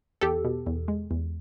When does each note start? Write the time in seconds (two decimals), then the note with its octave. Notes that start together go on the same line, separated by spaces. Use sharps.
0.21 E2 G4 A4
0.45 B2
0.67 E2
0.88 G#3
1.11 E2